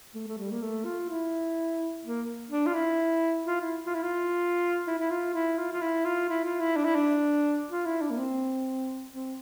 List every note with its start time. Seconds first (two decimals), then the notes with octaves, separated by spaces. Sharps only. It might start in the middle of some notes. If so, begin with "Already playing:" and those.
0.15 A3
0.27 A3
0.38 G3
0.51 A#3
0.62 A3
0.85 F4
1.10 E4
2.04 A#3
2.51 D4
2.67 F4
2.74 E4
3.46 F4
3.61 E4
3.86 F4
3.94 E4
4.03 F4
4.87 E4
4.99 E4
5.11 F4
5.34 E4
5.58 F4
5.72 F4
5.82 E4
6.05 F4
6.29 E4
6.44 F4
6.60 E4
6.76 D4
6.85 E4
6.95 D4
7.71 F4
7.86 E4
8.01 D4
8.10 A#3
8.17 C4
9.12 C4